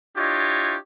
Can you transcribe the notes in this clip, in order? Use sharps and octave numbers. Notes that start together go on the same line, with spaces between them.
D4 E4 F4 G4 C#5 D#5